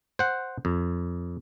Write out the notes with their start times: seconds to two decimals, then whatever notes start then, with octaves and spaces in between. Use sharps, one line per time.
0.19 C5 F#5
0.65 F2